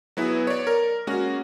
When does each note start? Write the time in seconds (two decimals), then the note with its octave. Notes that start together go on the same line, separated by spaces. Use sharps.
0.17 F#3 B3 E4 G#4
0.47 C#5 D5
0.67 A#4
1.07 G#3 A#3 C#4 F#4